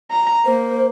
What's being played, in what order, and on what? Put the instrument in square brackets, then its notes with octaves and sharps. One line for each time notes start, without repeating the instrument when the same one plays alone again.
[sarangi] A#5
[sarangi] A#3 [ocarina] C5